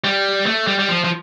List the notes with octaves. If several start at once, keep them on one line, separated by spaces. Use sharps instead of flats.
G3
A3
G3
G3
F3
F3